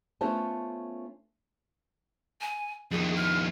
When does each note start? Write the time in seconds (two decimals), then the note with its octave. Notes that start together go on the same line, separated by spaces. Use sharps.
0.21 A3 B3 C#4 F4 C5 A5
2.41 G#5
2.91 F2 D#3 G#4
3.16 F6